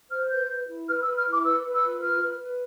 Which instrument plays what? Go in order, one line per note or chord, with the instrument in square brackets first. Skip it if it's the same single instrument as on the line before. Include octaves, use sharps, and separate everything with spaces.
[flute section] C5 F6
B4 G6
B4
E4
B4 F6
E6
B4
F6
E4
D6
B4 E6
B4
E6
F4
B4 F6
B4
B4